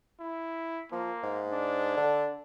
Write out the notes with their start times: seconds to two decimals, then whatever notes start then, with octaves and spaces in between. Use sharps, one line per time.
0.20 E4
0.92 F3 A#3
1.23 G#2
1.52 D4
1.97 D3